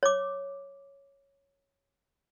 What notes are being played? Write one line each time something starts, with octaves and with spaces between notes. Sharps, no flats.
C#5 D6